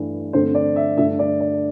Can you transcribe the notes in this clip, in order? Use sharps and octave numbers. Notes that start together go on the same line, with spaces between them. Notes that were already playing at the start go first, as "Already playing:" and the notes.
Already playing: G2 E3 A3 D4
G2 D3 A3 C4 C5
D5
E5
G2 D3 A3 E5
D5
D5